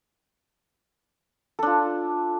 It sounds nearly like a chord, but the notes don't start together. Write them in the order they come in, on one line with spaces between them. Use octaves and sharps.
A4 D4 F4